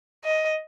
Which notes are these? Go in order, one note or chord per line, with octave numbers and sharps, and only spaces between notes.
D#5